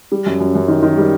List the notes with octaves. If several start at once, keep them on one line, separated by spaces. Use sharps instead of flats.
G3
F#2
F#2
F#2
D#3
D#3
G3